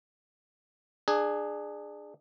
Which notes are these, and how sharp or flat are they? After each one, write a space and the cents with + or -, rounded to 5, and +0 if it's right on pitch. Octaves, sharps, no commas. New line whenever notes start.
D4 +25 G#4 +0